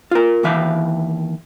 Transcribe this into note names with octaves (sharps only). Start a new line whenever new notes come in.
F4 A#4
D#2 E3 E5 F5